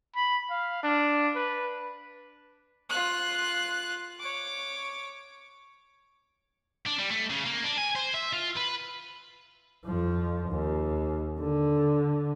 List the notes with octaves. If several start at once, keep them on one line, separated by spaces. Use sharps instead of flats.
B5
F5
D4
B4
F4 F#6
C#5 D6
D4
G3
A3
C#3
A#3
D4
G#5
C5
E5
F4
B4
F2 F3
D#2
D3